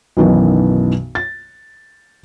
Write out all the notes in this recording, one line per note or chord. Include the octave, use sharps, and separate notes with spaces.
B1 F#2 B2 D#3 E3 F#3
A6